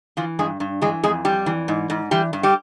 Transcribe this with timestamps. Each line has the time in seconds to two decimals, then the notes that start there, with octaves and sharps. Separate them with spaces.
0.17 E3 F3 F4
0.39 G2 G#3 G#4
0.60 G2
0.82 E3 G#3 G#4
1.03 F2 G#3 G#4
1.25 F2 G3 G4
1.46 E3
1.68 G#2
1.90 G#2
2.11 E3 G3 G4
2.33 G2
2.43 G3 G4